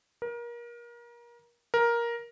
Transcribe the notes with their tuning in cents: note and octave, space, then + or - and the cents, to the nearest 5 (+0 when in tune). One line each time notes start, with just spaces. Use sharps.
A#4 +30
A#4 +10